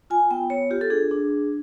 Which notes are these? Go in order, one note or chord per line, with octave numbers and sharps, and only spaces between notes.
F4 G#5
B3 G5
B3 C#5
F4 G4
A4
D4 G#4
D4
D4